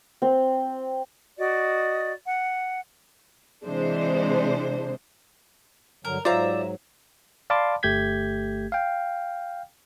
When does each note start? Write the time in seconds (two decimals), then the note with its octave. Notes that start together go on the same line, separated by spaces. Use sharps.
0.22 C4
1.38 F#4 D5 D#5
2.25 F#5
3.64 C3 E3 G#3 D4 C5
6.05 G2 D3 F#3 A#4
6.25 G#2 F#3 F4 C5 D5 E5 F5 A#5
7.50 D5 F5 A5 B5 C6 D6
7.83 G1 A3 G4 G6 G#6 B6
8.72 F5 G5